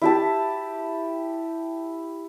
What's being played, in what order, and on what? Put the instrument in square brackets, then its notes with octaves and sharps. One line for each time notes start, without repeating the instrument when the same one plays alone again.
[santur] E4 G4 A5